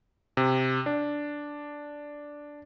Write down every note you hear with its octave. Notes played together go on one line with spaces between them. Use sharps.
C3
D4